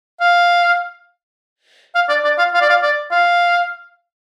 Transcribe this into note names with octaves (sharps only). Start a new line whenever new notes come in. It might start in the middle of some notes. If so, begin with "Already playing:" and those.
F5
F5
D5
D5
F5
F5
D5
F5
D5
F5